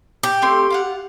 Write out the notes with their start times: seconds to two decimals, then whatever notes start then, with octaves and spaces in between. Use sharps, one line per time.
0.23 G4
0.42 A3 C4 C6
0.70 F4 F5 F#5